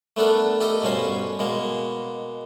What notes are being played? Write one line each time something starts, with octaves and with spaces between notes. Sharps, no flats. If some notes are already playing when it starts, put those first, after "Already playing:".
A3 B3 D4 A4 A#4
G4 A4 A#4 D#5
G2 B2 C#4 C5
B2 G#3 A#3